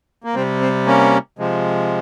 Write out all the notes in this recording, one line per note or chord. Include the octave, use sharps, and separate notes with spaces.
A#3
C3 G3 C4
C4
A#3 C#4
C3 F3 G#3